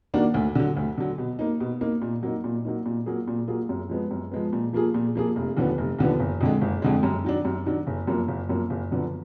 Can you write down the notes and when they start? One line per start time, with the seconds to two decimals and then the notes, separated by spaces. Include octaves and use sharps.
0.14 D#3 A#3 D4 F#4
0.34 D2
0.55 D3 F#3
0.76 D2
0.98 D3 F#3
1.18 B2
1.39 A#3 D#4
1.60 B2
1.81 A#3 D#4
2.02 A#2
2.23 F#3 A#3 D#4
2.44 A#2
2.65 F#3 A#3 D#4
2.86 A#2
3.06 F#3 A#3 F4 G#4
3.28 A#2
3.48 F#3 A#3 F4 G#4
3.69 F#2
3.89 F3 G#3 B3
4.11 F#2
4.31 F3 G#3 B3
4.53 A#2
4.73 F3 A#3 F4 G#4
4.94 A#2
5.15 F3 A#3 F4 G#4
5.36 F1
5.57 D#2 D3 F3 B3
5.78 F1
5.99 D#2 D3 F3 B3
6.20 F#1
6.41 F2 D3 G#3
6.61 F#1
6.82 F2 D3 G#3
7.03 F#2
7.24 D#3 F#3 D4
7.45 F#2
7.66 D#3 F#3 D4
7.87 F#1
8.07 F#2 F3 A#3
8.28 F#1
8.49 F#2 F3 A#3
8.70 F#1
8.91 F#2 D3 F3 B3